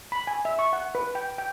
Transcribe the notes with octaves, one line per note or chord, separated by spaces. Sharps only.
B5
G#5
E5
C#6
F#5
B4
G5
G5